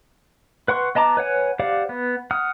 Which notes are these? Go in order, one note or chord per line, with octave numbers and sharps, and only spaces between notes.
B4 F#5 C6 C#6
B3 D#5 A5 A#5 D6
B4 C#5 F#5 G#5
G4 C5 D5 F5 F#5
B3
F#5 D#6 F6